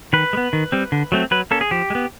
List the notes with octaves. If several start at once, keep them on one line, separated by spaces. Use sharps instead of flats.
D#3 B4
G#3
B3
D#3
G3 C4
D3
F#3 A3 C4
F#3 B4
A#3 C#4 A4
G#4
F3 G4
G#3
B3